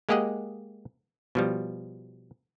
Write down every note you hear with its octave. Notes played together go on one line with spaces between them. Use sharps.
G#3 A#3 G4 G#4 D#5 F#5
B2 F3 G3